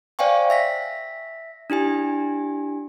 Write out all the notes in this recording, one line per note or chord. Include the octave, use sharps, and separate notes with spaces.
C5 D5 F5 G5 G#5 C#6
E5 A#6 B6
D4 E4 G4 G#5